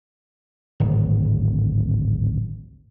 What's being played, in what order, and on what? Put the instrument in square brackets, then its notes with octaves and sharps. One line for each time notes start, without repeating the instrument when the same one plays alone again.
[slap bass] D1 G#1